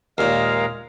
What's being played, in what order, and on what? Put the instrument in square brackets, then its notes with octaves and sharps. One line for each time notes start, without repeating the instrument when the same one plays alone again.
[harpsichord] D#2 A#2 [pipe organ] G#3 A#4 F5